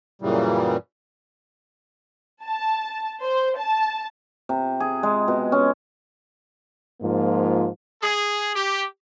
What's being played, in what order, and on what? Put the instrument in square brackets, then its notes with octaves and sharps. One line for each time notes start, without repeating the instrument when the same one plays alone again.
[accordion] F#2 A#2 C#3 E3 G3
[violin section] A5
C5
A5
[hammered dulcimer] C3
G#4
G#3
B2
C#4
[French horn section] G#2 F3 A#3 F4
[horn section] G#4
G4